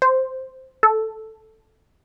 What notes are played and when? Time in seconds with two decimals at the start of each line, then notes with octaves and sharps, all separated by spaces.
0.02 C5
0.83 A4